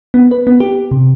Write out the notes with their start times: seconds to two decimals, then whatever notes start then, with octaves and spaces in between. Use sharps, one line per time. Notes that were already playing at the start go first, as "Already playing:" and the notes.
0.14 B3
0.31 B4
0.47 B3
0.60 G4
0.91 C3